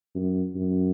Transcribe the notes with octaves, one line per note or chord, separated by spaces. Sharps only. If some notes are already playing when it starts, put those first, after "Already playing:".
F#2
F#2